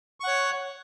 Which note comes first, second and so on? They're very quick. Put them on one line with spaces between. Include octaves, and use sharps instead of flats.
C#6 F#5 C#5